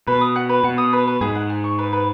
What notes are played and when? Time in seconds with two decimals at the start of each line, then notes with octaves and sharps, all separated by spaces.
0.07 B2 B4
0.21 D#6
0.36 F#5
0.49 B4
0.64 B2 F#5
0.78 D#6
0.93 B4
1.07 B4
1.21 G#2 G#4
1.35 F#5
1.50 G#4
1.64 C#6
1.79 B4
1.93 B4